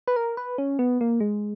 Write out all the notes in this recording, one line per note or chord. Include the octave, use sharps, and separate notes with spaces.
B4
A#4
B4
C#4
B3
A#3
G#3